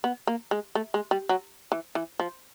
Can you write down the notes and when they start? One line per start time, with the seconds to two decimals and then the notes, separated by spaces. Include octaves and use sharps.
0.04 B3
0.27 A#3
0.51 G#3
0.75 A3
0.94 G#3
1.11 G3
1.29 F#3
1.72 E3
1.95 E3
2.19 F3